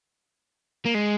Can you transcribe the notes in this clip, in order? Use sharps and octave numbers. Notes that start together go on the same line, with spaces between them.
A#3
G#3